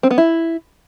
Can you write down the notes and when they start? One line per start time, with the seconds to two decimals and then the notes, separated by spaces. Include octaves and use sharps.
0.03 C4
0.11 B3
0.18 E4